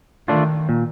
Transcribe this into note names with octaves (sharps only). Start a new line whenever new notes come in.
D#3 A3 D4 F4
A#2